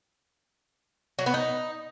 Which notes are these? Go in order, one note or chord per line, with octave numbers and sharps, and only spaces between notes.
F#3
B3
D#4